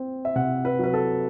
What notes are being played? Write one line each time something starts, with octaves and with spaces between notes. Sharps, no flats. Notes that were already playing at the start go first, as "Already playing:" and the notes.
Already playing: C4
E5
C3 F#5
B4
F#3 B4
A4